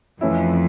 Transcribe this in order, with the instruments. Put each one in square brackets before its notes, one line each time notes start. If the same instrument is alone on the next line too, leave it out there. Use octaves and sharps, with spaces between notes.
[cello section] F2 [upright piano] E3 A3 C#4 E4